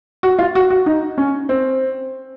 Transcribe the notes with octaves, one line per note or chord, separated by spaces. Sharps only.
F#4
F4
F#4
F#4
D#4
C#4
C4